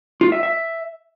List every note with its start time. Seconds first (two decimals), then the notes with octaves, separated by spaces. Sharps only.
0.21 F4
0.32 E5
0.43 E5